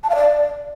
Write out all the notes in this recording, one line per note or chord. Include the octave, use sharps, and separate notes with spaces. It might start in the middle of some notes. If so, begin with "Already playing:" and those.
A5
F5
D5